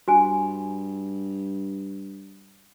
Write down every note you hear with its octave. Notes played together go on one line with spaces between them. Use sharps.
G2 F#4 G#5